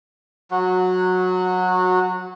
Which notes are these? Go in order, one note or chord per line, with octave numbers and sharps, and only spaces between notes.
F#3 F#4